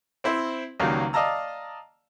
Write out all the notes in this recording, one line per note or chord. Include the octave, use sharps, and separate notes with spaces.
C4 E4 C5
C#2 D#3 F#3 G3 A#3
D5 D#5 F5 A5 A#5 E6